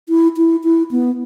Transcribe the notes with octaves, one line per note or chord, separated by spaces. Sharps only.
E4
E4
E4
B3